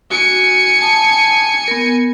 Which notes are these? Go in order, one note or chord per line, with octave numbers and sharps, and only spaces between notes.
F#4 G#5 C#7
A5 D#6
B3 A#4